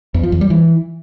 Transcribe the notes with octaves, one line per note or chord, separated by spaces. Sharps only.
E2
F3
E2
G3
E3